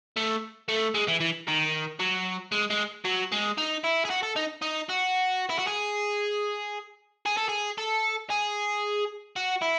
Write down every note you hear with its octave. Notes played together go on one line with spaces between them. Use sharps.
A3
A3
G#3
E3
E3
D#3
F#3
G#3
G#3
F#3
G#3
D#4
E4
G#4
F#4
A4
D#4
D#4
F#4
E4
F#4
G#4
G#4
A4
G#4
A4
G#4
F#4
E4